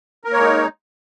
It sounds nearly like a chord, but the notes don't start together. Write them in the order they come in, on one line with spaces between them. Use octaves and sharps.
A#4 A#3 C#5 G#3 D#4